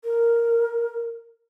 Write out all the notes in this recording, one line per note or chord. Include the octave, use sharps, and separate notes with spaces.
A#4